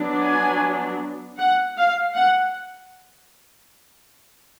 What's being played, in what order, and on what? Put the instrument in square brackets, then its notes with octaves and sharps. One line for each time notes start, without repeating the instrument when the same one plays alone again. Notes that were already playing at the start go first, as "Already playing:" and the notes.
Already playing: [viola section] F#3 B3 D4
G#5
F#5
F5
F#5